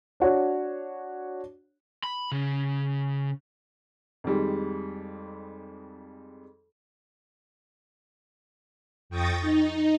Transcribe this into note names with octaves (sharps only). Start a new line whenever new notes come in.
D4 F#4 C#5
B5
C#3
F2 D#3 G3 G#3
F2 G5 C#6 D#6 A6 A#6
D#4